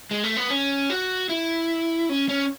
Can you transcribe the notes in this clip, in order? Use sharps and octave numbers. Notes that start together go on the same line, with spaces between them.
G#3
A3
B3
C#4
F#4
E4
C#4
C#4